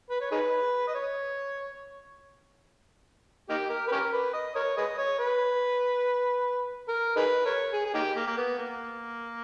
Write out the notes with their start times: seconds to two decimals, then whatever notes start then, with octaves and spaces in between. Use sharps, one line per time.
0.10 B4
0.21 C#5
0.32 D#4 G#4 B4
0.87 D#5
0.94 C#5
3.49 A#3 D#4 G4
3.70 A#4
3.88 B4
3.92 C#4 G4 A#4
4.13 B4
4.33 D#5
4.55 A#4 C#5
4.77 G#4 B4 D#5
4.98 C#5
5.19 B4
6.89 A#4
7.16 D#4 G#4 B4
7.46 A#4 C#5
7.73 G#4
7.86 G#4
7.94 A#3 D#4 G4
8.16 A#3
8.27 A#3
8.37 B3
8.58 A#3